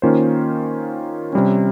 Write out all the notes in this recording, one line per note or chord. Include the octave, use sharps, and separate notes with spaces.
D#3 A#3 C#4 F4 C5
C3 G3 C#4